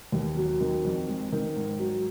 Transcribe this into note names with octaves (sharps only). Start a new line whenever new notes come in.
D#2
F#3
D#3
F2
G#3
D#3
G#2
F#3